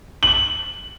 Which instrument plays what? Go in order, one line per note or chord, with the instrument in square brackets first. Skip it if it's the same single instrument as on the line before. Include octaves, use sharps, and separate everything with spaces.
[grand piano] F#7